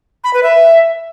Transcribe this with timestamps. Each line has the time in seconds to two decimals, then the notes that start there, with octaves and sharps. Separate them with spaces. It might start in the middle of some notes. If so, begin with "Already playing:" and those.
0.24 B5
0.33 B4
0.43 E5